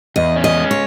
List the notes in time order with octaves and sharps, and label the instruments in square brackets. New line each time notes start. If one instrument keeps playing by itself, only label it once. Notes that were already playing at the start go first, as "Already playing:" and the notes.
[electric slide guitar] E2 [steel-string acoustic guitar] D#5
[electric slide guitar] C#4
[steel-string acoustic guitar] D#5
[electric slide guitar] G#3
[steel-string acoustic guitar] C#5